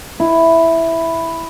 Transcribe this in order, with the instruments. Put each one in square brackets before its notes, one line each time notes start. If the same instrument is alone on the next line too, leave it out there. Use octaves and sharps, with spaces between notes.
[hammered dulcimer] E4